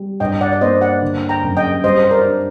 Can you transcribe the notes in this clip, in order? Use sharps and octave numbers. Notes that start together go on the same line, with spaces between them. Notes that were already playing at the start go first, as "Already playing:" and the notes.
Already playing: G3
G2 D#5 G5
D5 F#5
D5
A#3 C5 D#5
D5 F#5
D3
G5 A#5
F#2
D#5 G5
G3 C5 D#5
C5
A#4 D5
D4